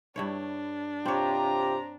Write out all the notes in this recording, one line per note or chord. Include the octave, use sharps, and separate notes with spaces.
G2 D4 E4 C#5
C3 C4 F4 G4 C5 C#5 A#5